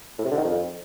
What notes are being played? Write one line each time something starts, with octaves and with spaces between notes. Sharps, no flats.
A2
C3
D3
D#3
F2